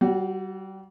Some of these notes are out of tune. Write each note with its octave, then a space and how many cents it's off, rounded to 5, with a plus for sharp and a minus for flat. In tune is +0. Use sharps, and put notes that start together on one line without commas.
G3 -30 F#4 +0